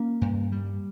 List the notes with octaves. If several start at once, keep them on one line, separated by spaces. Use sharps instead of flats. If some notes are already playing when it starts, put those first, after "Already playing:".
Already playing: A#3 C#4
G2
G3